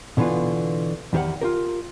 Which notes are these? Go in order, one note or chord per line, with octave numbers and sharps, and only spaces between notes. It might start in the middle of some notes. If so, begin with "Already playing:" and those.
B2 D3 E3 B3 F4
E2 D#3 G4 C#5 F#5
F4 G4 A#4